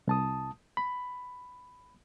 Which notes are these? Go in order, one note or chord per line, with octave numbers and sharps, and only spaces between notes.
C2 A5 D#6
B5